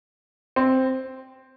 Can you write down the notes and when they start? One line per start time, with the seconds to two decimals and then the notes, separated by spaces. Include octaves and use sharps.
0.56 C4